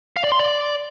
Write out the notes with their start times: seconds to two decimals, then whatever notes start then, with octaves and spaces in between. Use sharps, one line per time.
0.17 F5
0.24 D5
0.32 C6
0.39 D5